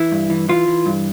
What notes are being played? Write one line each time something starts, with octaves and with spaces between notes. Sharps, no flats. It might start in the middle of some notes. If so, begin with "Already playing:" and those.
Already playing: E3 E4
G2
E3
E3 F4
E3
G2